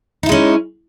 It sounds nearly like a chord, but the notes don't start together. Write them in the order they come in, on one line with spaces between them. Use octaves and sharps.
D#4 E4 G#3 C#4